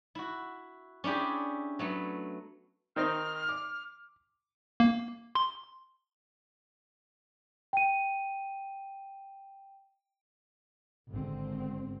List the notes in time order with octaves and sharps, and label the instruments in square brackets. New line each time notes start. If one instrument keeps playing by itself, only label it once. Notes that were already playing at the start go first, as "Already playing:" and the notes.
[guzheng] E4 F#4
C#4 D4 E4 G4 G#4
F#3 A3 B3
[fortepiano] D#3 C4 D#4 [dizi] F6
[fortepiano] D6
[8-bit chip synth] A#3
C6
[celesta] G5 D#7
[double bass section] G#1 G#2 D3 C4